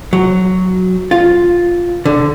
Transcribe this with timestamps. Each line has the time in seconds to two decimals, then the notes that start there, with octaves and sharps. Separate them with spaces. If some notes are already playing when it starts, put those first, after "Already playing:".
0.13 F#3
1.11 F4
2.05 D3